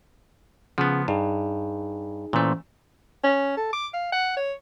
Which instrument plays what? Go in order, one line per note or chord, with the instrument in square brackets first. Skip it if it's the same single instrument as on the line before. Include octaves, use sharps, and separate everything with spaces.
[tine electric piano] C#3 F#5 [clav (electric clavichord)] F3 B3
[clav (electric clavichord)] G2 [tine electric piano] D#4 G#4
[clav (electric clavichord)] A#2 A3 [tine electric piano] E3 C#4 C5
[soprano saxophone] C#4
A4
D6
F5
F#5
C#5